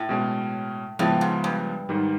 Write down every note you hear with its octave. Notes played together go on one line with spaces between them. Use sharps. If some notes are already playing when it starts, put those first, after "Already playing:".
Already playing: A2
B2 G#3 C#4
A2 C#3 F3 G#3 B3
G#2
G2
G#2 D#3 G3